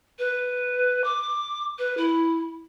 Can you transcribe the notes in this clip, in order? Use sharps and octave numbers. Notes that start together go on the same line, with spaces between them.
B4
D6
B4
E4